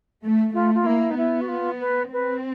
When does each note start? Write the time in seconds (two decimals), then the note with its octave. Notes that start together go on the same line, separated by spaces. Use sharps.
0.23 A3
0.54 A3 F4
0.74 F4
0.86 A#3 E4
1.11 D#4
1.17 B3 E4
1.41 F#4
1.48 F4
1.80 B4
2.13 C4 B4